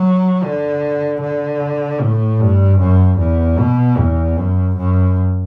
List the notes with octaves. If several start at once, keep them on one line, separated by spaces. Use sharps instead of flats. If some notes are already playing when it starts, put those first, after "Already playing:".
Already playing: F#3
D3
D3
A2
G2
F#2
E2
B2
E2
F#2
F#2